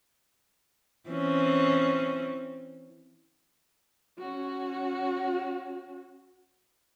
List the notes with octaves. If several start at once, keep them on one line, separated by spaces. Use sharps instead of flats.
E3 C4 C#4
C#4 F#4